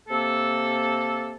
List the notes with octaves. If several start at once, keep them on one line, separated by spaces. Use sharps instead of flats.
C3 A#3 A4